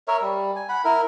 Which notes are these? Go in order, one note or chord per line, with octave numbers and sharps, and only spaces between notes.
A#4 C#5 E5
G3
G#5
F#5 B5
E4 A#4